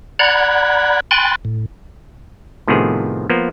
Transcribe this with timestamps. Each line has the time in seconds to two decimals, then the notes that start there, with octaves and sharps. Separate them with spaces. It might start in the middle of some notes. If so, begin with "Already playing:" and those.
0.19 D5 F#5 A#5 B5 F#6 G#6
1.11 G5 G#5 B5 C6 F#6 A6
1.45 A2
2.67 A2 C3 D#3 F3 B3 G#4
3.30 F3 A#3 B3